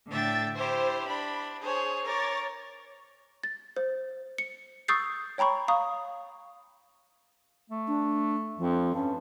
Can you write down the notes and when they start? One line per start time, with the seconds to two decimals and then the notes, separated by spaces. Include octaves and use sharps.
0.11 A2 D3 E5 G5 A6
0.57 E4 G4 C5
1.07 D4 B5
1.61 G#4 C5 C#5
2.04 A#4 C#5 D6 A6
3.43 A6
3.77 C5
4.38 C#7
4.88 C#6 D#6 E6 G6 A6 C7
5.38 C#5 G5 A#5 B5 C#6
5.68 F5 A#5 C#6 D#6
7.70 A3
7.88 D4
8.58 F2 F3
8.95 G2 C#4